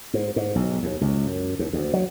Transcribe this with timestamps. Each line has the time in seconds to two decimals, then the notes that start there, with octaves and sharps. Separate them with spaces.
0.14 G#2
0.36 G#2
0.55 B1
0.83 D#2
1.01 C#2
1.27 F#2
1.59 D#2
1.73 D2
1.93 F#3